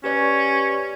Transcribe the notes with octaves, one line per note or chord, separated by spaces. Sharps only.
C#4 G4 B4 D5